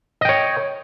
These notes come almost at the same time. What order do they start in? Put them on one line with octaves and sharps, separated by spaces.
D#5 G5 C#5